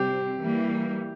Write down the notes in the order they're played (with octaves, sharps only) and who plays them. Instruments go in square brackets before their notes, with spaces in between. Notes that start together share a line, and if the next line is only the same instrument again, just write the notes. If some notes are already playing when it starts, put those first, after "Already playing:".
Already playing: [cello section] C3 G3 C4 [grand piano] G4
[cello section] E3 G3 A#3